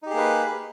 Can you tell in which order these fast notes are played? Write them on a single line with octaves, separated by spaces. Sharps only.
D#4 G4 G#4 A#3 B4